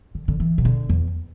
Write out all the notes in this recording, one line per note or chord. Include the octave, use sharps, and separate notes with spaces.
D3
D3
E3
B2
D3
E2